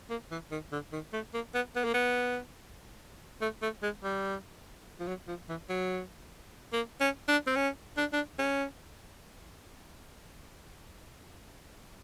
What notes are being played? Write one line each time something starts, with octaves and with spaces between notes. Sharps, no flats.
A#3
E3
D#3
D3
D#3
A3
A#3
B3
B3
A#3
B3
A3
A3
G#3
G3
F3
F#3
F3
E3
F#3
A#3
C#4
D4
C4
C#4
D4
D4
C#4